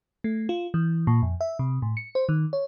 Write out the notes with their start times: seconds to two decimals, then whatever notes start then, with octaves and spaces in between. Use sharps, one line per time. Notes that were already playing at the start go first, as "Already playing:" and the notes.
0.24 A3
0.49 F4
0.74 E3
1.07 A#2
1.22 F2
1.41 E5
1.59 C3
1.82 A2
1.97 C#7
2.15 C5
2.29 D#3
2.53 C#5